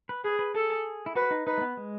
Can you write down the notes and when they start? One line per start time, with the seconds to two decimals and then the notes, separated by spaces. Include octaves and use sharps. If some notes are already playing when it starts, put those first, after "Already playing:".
0.09 B4
0.24 G#4 B4
0.39 B4
0.54 G#4 A4
1.06 E4
1.15 F#4 B4
1.31 D#4
1.47 D#4 B4
1.58 A3
1.61 B3
1.77 G#3